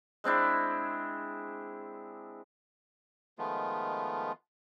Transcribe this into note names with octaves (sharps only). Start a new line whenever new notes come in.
G#3 C4 D4 E4
D#3 F3 G#3 A3 B3 F4